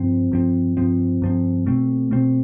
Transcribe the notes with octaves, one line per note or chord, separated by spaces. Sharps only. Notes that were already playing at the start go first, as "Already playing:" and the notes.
Already playing: G2 F3 C4
G2 F3 C4
G2 F3 C4
G2 F3 C4
B2 A3 C4
B2 A3 C4